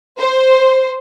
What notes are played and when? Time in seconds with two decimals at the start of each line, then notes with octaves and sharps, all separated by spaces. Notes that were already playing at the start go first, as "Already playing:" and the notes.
0.19 C5